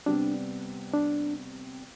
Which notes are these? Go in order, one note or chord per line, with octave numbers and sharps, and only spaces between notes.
C3 G3 B3 D4
D4